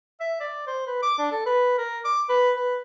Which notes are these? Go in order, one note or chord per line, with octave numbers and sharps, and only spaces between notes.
E5
D5
C5
B4
D6
D4
A4
B4
A#4
D6
B4
B4